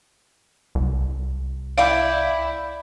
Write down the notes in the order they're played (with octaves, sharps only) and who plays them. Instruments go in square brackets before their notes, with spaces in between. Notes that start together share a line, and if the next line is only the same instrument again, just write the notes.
[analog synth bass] C2
[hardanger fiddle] E4 [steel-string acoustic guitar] D5 G5 [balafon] F5